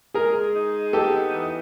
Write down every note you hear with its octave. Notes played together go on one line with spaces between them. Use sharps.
G#3 G#4 A#4
D#4
B3 G4 A4
E3